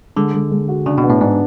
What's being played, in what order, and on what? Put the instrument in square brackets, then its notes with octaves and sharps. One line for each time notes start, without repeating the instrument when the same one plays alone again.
[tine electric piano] D3 [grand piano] G#3
[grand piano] G#3
G#3
F#4
[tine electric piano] C#3 [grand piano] D4
[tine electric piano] B2
[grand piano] B3
[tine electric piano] A2
[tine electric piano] G#2 [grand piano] D4